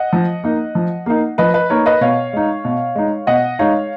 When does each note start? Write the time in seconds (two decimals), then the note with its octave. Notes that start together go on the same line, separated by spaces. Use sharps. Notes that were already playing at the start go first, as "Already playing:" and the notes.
Already playing: D#5 F#5
0.13 F3
0.44 A#3 D#4
0.75 F3
1.06 A#3 D#4
1.38 F3 B4 D#5
1.54 B4 D#5
1.70 A#3 D#4 A#4 C#5
1.86 B4 D#5
2.01 B2 C#5 F5
2.33 G#3 D#4
2.65 B2
2.95 G#3 D#4
3.27 B2 D#5 F#5
3.59 G#3 D#4 C#5 F5